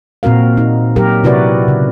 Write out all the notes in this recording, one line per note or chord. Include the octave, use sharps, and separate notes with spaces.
A#2 C4 F#4 A#4 F5
D#4
F#3 G4 A#4
C3 E4 F#4 B4 D5
C#3